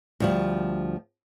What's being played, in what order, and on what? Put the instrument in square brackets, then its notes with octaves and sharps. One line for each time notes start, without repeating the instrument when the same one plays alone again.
[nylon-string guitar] D2 F3 G3